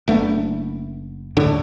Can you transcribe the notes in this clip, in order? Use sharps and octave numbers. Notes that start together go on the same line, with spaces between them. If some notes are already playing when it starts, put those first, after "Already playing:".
F#1 A3 B3 D4
D#1 A2 D3 D4